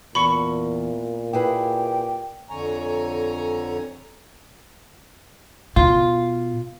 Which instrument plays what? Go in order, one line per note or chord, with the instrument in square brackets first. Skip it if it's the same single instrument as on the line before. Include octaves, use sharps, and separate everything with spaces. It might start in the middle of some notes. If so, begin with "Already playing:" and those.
[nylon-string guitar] E2 [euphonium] A#2 [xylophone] B5 C#6 C#7
[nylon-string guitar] E4 G#4 B4 [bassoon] G4
[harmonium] F2 D3 C#5 G#5 A#5
[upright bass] B2 [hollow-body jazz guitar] F4